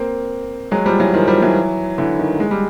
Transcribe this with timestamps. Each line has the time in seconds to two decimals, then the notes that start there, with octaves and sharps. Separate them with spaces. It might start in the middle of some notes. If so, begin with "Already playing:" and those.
Already playing: A#3 C4
0.71 F#3 G#3
0.86 F3 G3
1.00 E3 F#3
1.14 D#3 F3
1.27 F3 G3
1.42 E3 F#3
1.98 D3 E3
2.19 D#3
2.40 G#3
2.51 G3